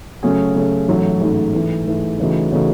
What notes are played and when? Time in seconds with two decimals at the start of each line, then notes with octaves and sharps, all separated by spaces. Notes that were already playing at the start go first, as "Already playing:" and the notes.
0.23 C#3 F#3 A3 C#4 G#4
0.55 C#3 F#3 A3 C#4 G#4
0.88 A1 G#2 F#3 A3
1.21 A1 G#2 F#3 A3
1.54 G#2 E3 A3
1.87 G#2 E3 A3
2.19 C#3 E3 A3 D#4 F#4
2.52 C#3 E3 A3 D#4 F#4